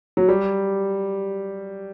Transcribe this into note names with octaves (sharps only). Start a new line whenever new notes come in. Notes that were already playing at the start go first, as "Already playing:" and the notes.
F#3
G3